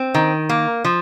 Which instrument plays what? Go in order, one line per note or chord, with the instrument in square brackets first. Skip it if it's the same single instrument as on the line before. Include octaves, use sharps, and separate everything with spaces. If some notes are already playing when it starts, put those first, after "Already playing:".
Already playing: [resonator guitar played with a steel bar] C4
D#3
A#3
F3